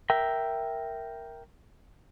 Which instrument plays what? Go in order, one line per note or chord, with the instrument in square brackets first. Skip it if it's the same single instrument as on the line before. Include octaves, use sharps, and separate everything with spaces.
[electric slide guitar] A#4 E5 G5